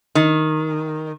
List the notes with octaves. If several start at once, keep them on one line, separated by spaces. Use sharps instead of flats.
D#3